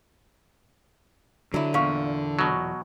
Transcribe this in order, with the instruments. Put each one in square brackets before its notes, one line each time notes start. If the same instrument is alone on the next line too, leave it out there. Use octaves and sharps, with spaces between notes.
[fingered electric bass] D3 [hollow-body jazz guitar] F#3 E4
[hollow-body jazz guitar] E2 A#2 [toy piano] D5 F5 C#6
[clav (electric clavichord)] B2 F#3